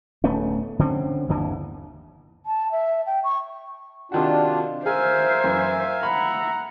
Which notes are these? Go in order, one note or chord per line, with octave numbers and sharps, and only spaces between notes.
D1 A3 B3 C#4
D3 C4 C#4
G1 D#2 D3 E3
A5
E5
G5
C#6
C3 D#3 D4 F4 F#4
G#4 A#4 C5 E5 F5 G#5
F#2 E3
F#5 A#5 B5